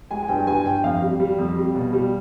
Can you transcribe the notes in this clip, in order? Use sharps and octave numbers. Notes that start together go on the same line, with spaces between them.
G#3 G#5
G#5
G2 G5
G2 G#5
G2 G5
F2 F5
G3
G3
F2
G3
B2
G3